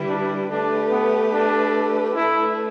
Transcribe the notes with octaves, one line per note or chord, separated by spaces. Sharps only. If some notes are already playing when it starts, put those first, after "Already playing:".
Already playing: D3 G3 E4 B4
D4
A3 D4 G4 B4
B3
D4
A3 D4 E4 B4